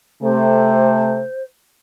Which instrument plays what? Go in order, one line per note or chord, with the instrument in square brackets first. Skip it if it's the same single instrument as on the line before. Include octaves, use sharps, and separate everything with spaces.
[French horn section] C3 A3 [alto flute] C5